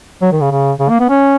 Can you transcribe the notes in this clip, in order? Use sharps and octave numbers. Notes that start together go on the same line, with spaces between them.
F#3
D#3
C#3
C#3
C#3
A#3
B3
C#4